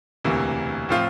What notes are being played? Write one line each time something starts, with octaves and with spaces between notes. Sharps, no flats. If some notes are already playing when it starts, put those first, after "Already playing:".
E1 D2 C3 E3 A#3
A2 F3 C4 F4